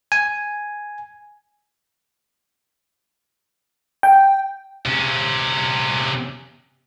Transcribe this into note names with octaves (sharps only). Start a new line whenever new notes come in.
G#5
G5
C3 C#4